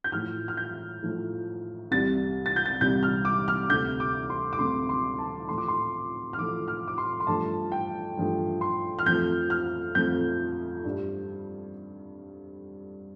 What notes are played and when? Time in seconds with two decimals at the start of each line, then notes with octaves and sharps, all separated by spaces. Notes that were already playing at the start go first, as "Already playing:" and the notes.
0.04 G6
0.12 A2 F3 A3 F6
0.48 F6
0.57 G6
1.02 A2 F3 A3
1.91 C2 C3 G3 A6
2.46 A6
2.56 G6
2.66 A6
2.81 C2 C3 G3 G6
3.03 F6
3.25 D6
3.48 F6
3.70 D2 C3 A3 G6
4.00 D6
4.30 C6
4.53 D6
4.59 D2 C3 A3 C6
4.89 C6
5.18 A5
5.49 A2 F3 A3 C6
5.58 D6
5.68 C6
6.33 F6
6.38 A2 F3 A3 D6
6.68 F6
6.88 D6
6.98 C6
7.20 C6
7.27 G2 F3 A3 A5
7.72 G5
8.17 G2 F3 A3
8.61 C6
8.99 F6
9.06 F2 F3 A3 G6
9.50 F6
9.95 F2 F3 A3 G6
10.84 G2 G3